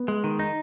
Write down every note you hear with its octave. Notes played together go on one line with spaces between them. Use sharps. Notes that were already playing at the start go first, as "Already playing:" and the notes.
Already playing: B3
G#3
D#3
D#4